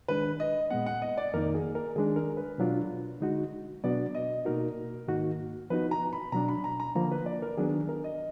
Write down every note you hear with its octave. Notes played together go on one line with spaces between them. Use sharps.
D#3 G#3 D4 B4
D#5
A#2 G#3 B3 F#5
F#5
D#5
D5
F2 D#3 A#3 D#4 A#4
G#4
A#4
D#3 G#3 D4 G#4
A#4
B4
B2 F#3 D4 F4
D3 G#3 D#4 F#4
B2 F#3 B3 D4 F#4 D5
D#5
B2 A#3 D#4 F#4 A#4
G#2 D#3 A#3 D#4 F#4
F3 B3 D#4 F#4 B4
A#5
B5
B2 F#3 D4 A#5
B5
A#5
A#5
D3 F3 A#3 A#5
B4
D5
A#4
D#3 F#3 B3 D4 G#4
A#4
D#5